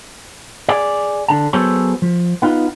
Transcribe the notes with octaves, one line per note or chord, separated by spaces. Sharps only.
G#4 D5
D3 A5
F#3 B3 G#4 A4 C5 C#5
F3
B3 D#4 F4